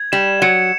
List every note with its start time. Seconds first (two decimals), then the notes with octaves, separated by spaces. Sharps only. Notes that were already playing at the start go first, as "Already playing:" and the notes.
Already playing: G#6
0.12 G3 E7
0.42 F#3 C#7